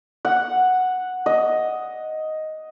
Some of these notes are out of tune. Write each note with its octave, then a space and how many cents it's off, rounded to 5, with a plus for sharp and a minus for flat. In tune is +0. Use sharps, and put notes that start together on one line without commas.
F#5 -5
D#5 +5